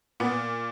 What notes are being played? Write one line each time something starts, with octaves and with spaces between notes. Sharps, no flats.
A#2 B3